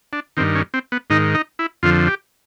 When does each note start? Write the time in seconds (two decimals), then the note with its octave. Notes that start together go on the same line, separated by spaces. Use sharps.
0.13 D4
0.37 D#3 C4
0.40 G2
0.55 C#4
0.74 C4
0.92 B3
1.10 G#2 D#3 D#4
1.34 D#4
1.59 E4
1.83 F2 D3 F3 F4
2.07 G4